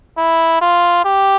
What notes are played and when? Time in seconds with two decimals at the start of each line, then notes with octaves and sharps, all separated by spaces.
0.18 E4
0.61 F4
1.05 G4